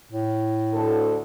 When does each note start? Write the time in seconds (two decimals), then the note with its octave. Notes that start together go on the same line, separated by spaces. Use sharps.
0.12 A2
0.73 D2 A4